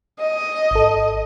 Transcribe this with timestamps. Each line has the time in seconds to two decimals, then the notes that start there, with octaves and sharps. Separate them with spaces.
0.20 D#5
0.71 G#1 A4